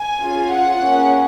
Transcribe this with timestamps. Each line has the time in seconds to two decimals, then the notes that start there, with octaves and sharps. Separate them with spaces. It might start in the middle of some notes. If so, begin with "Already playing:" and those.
Already playing: G#5
0.19 C#4 F4 G#4
0.50 F#5
0.82 A#3 C#4 G#4